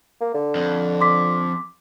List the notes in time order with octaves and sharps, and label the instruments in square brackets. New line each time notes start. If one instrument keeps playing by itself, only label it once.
[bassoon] A#3
D3
[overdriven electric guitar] F2
[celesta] C6 D6 B6